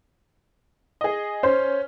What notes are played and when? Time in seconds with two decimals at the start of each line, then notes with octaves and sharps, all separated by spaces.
1.01 G#4 D#5
1.43 C#4 C5